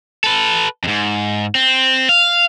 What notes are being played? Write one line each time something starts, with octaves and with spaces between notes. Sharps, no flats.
A4 B4
F2 G#2
C4
F5